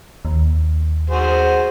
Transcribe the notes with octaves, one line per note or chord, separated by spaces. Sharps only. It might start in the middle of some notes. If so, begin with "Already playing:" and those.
D#2
F#4 G#4 C5